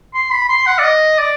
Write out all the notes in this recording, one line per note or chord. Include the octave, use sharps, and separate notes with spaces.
C6
B5
C6
F#5
D5
D#5
D5